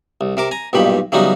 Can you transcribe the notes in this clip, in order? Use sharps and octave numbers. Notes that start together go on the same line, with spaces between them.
C2
C3 A#4 D6
G#5 A#5
B1 G2 A#2 D#3 G4 B5
C#3 E3 F#3 G3 B3 D#4